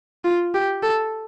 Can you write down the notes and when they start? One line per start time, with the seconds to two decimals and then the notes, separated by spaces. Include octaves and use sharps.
0.24 F4
0.54 G4
0.83 A4